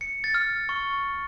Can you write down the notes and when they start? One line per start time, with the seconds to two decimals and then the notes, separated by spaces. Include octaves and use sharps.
0.01 C#7
0.24 A6
0.34 F6
0.69 C#6